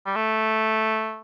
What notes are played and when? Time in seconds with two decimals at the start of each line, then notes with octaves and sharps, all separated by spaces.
0.06 G3
0.15 A3